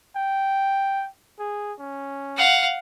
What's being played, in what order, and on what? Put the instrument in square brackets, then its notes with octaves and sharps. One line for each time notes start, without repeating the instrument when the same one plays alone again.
[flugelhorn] G5
G#4
C#4
[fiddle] F5 F#5